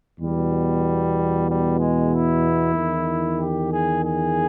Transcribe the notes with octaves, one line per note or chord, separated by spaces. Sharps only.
E2 B2 G3
G3
G#3
E4
E2 D#3
G4
G#4
G#4